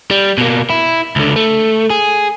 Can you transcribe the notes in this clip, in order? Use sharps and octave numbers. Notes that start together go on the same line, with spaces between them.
G3
B2 A#3
E4
C#2 D3
A3
G#4